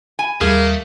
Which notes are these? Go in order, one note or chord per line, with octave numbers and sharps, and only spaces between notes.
G#5
D#2 G3 A3 A#3 G#4